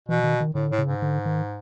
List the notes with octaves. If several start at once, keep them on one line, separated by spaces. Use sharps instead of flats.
B2 E3
D#3
D#3
A2 D3
A2
C#3
G#2
D3
D#3